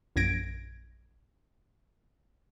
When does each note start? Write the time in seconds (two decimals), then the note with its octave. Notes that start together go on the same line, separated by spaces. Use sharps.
0.16 A#1 F#2 G#6 A#6 D7